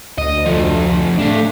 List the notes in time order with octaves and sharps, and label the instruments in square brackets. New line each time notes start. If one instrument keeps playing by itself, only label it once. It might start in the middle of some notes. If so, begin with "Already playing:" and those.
[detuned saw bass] D2 [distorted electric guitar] D#5
[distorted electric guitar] F3 A3
[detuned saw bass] A3 [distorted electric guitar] D4 F5